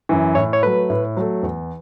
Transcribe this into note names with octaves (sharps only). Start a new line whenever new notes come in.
F#2 E3
A2 C#5
C#5
F#3 A3 B4
A2
F#3 A3
E2